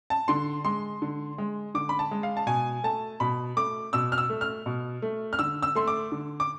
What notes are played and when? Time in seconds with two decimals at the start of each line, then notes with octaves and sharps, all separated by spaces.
0.10 A5
0.28 D3 C6
0.64 G#3 C6
1.02 D3
1.38 G#3
1.74 D3 D6
1.89 B5
1.99 A5
2.11 G#3
2.23 F5
2.37 A5
2.47 B2 G#5
2.84 A3 A5
3.20 B2 B5
3.57 A3 D6
3.93 B2 E6
4.12 F6
4.18 E6
4.30 A3
4.41 F6
4.66 B2
5.02 A3
5.33 F6
5.39 D3 E6
5.62 E6
5.75 A3 C6
5.87 D6
6.12 D3
6.40 D6